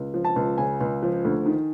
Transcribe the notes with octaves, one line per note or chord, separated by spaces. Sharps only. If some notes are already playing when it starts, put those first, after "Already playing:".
Already playing: C#2
F3
A5
C#2
C#3 G#5
C#2
F3
D2
D#3